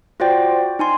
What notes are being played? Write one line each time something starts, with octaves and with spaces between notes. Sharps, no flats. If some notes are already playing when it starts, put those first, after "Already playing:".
F4 F#4 C5 D5 G5
D#4 G#5 C6